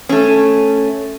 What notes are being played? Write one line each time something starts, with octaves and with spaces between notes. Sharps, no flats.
A3 C#4